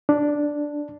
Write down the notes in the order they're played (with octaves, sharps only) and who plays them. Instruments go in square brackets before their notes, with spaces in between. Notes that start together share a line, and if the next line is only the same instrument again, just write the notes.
[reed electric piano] D4